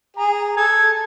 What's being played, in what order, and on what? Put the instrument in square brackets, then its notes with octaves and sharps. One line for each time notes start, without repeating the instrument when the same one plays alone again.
[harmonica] G#4 [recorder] A#5
[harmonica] A4 [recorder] G#6